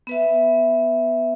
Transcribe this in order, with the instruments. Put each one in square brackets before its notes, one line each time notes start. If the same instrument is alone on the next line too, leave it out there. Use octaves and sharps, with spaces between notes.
[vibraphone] B3 B4 E5